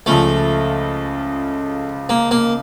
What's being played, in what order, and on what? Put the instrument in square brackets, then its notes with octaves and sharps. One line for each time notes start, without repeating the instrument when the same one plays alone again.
[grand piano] C#2 C#3 F3 [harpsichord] A3
[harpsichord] A#3
A#3